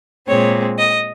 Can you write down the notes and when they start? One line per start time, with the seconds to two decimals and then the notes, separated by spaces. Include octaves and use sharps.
0.28 A#2 G#3 C4 C#5
0.78 D#5